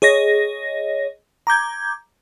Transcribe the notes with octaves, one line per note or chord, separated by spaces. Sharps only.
G#4 C#5 D#5 A#6
A#5 D6 G6 G#6